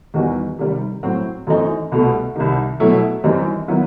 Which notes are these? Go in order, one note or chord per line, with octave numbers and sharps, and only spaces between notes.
E2 D#3 G3 D#4 F#4
C3 D#3 G3
A2 F#3 C4 F#4
F#2 E3 A3 C4 D#4
C2 B2 A3
C2 C3 D#3
B2 F#3 A3 E4
F#2 E3 G3 C4 D#4
D#3 F#3 B3 E4